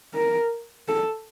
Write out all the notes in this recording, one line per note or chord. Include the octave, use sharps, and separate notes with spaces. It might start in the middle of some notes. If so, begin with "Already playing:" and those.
A#4
A4